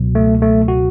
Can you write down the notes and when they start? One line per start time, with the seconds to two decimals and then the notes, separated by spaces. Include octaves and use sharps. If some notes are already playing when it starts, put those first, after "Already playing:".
Already playing: C#2 B2 F#3
0.15 A3
0.42 A3
0.68 F#4